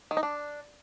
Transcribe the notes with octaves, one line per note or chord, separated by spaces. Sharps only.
D#3
D#4
D4